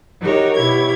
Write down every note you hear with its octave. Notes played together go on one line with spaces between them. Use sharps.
D#4 F#4 G4 A#4 C#5
B2 E4 G4 C#5 G#6